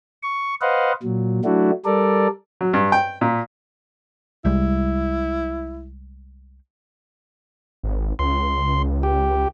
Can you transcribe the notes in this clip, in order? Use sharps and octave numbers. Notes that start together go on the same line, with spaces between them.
C#6
B4 C5 D#5 F5 F#5
A#2 F#3
F#3 A3 D4 E4 F#4
G3 A4 A#4 D5
F#3
G2
G5
A#2
C2 G3 G#3 E4
G#1
C#2 C6
G4